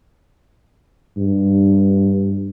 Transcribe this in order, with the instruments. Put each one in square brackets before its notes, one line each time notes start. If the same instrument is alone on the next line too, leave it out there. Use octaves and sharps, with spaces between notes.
[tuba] G2